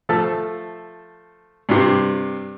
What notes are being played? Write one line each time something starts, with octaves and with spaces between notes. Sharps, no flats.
F3 A3 A4 A5
G2 C3